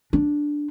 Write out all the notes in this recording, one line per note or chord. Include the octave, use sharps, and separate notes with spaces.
D4